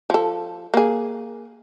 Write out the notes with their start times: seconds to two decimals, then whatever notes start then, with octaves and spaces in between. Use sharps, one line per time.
0.10 F3 A4
0.74 A#3 G#4